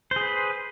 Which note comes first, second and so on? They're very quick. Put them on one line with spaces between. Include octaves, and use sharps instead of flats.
C5 G#4 B4